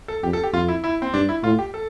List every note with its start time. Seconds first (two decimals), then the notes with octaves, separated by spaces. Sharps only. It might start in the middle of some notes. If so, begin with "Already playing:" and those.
0.08 A4
0.23 F2 G4
0.33 A4
0.43 G4
0.53 F2 F4
0.68 E4
0.84 E4
1.02 C4
1.13 G2 D4
1.29 E4
1.43 A2 F4
1.59 G4
1.74 A4